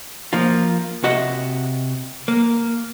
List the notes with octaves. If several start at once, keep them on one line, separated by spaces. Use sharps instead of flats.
F3 A#3 F4
C3 F#4 D#5 E5 F#5
A#3